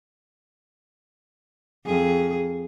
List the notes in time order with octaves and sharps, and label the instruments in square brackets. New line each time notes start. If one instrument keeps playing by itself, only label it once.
[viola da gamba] F2 G#4